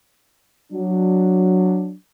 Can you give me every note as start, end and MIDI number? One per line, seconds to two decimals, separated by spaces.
0.72 1.94 54
0.72 1.94 62